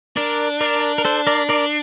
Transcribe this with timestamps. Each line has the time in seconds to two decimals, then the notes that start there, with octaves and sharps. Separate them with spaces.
0.16 D4 A#4 D5
0.61 A#4 D5
0.98 A#4
1.05 A4 C5
1.27 A#4 D5
1.49 A#4 D5